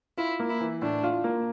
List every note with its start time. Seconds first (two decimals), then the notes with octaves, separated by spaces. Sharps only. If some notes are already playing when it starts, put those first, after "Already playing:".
0.17 E4 F4
0.40 A#3
0.50 E4
0.60 E3
0.82 A2 D4
1.04 F4
1.24 A#3